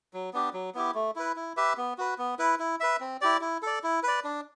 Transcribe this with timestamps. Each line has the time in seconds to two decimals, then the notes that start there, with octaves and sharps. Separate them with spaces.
0.13 F#3
0.33 B3 D4 G4
0.54 F#3
0.75 B3 E4 G4
0.95 A3
1.16 E4 B4
1.36 E4
1.57 G4 B4 E5
1.77 B3
1.98 F#4 B4
2.18 B3
2.39 E4 B4
2.59 E4
2.80 B4 E5
3.00 C4
3.21 E4 G4 D5
3.41 E4
3.63 A4 D5
3.83 E4
4.03 B4 D5
4.24 D4